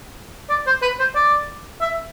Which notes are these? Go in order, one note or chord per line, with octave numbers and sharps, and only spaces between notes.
D5
C5
B4
C5
D5
E5